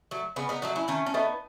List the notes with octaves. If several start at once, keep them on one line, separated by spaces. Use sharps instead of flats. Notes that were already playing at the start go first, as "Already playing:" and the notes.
F#3 A3
C#3 B3
B3 D#4
F#3 A3 D#4 F#4
C#4 E4
D#3 A3 C#4
C#4
A3 B3 D#4